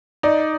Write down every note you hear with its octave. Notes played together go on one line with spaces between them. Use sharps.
D#4 D5